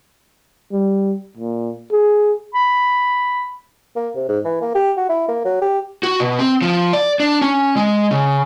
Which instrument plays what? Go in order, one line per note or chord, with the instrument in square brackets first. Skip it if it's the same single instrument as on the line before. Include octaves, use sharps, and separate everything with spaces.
[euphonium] G3
A#2
G#4
[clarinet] B5
[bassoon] A#3
C3
G#2
E3
A#3
G4
F#4
E4
A#3
F#3
G4
[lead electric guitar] F#4
B2
C4
F3
D5
D4
C#4
G#3
C#3